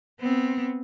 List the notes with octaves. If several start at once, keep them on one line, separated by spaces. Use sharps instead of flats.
B3 C4